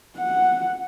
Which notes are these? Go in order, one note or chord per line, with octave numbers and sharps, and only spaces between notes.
F#5